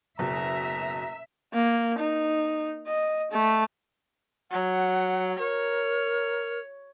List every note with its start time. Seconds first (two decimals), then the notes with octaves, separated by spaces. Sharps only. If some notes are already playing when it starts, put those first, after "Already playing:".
0.19 F#1 B2 E5 A#5
1.53 A#3
1.99 D#4
2.87 D#5
3.31 A3
4.51 F#3 F#5
5.39 A#4 C#5